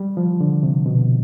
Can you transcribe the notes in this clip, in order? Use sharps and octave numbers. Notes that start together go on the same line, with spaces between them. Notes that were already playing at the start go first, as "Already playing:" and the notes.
Already playing: G3
F3
D3
C3
B2